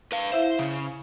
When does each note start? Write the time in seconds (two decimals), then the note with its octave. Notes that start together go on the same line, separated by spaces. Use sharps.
0.12 B4 F5
0.32 E4 C5 E5 F5
0.59 C#3